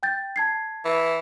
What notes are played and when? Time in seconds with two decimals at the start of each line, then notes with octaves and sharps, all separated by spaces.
0.03 G5 G6 A6
0.36 A5 G#6 C7
0.85 E3